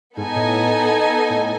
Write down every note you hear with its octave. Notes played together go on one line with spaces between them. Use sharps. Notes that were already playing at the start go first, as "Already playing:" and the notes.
G#2 B3 D#4 A4 D#5 G#5
A2
A2